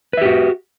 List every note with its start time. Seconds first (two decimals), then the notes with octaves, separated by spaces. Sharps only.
0.13 B4
0.17 E5
0.21 G4
0.25 F#4